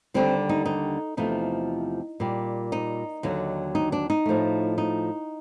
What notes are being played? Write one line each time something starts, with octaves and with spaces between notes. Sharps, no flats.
D#2 D3 G3 C4
D#4
D#4
E2 C3 F3 A3 D#4
A#2 G3
D#4
D#2 D3 F#3
D#4
D4
D#4
A2 F3 A3
D#4